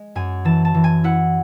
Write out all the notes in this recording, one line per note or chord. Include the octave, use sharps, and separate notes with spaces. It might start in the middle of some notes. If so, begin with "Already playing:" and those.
Already playing: G#3
F#2 G#5
E3 A5
A5
E3
G#5
E4 F#5